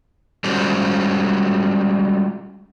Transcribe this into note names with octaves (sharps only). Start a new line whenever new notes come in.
G3 G#3 C#4 F4 F#4 C5